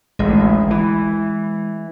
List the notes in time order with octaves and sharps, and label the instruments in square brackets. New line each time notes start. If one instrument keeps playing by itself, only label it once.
[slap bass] A1 D2 [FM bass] G#3
[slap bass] E3